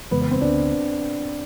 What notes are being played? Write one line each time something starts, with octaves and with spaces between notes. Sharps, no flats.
F2 C#3 E3 G#3 B3
B3
C4
D2 D3 F#3 B3 D4